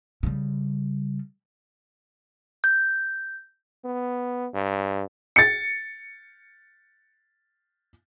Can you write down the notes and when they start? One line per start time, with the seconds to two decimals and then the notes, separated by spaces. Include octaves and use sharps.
0.23 C#3 G3
2.64 G6
3.85 B3
4.54 G2
5.36 A6 C#7